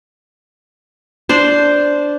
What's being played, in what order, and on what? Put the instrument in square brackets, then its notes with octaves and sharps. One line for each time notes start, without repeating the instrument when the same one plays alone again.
[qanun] D4 C5